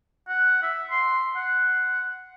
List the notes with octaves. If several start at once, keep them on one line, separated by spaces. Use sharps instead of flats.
F#5
E5
C6
F#5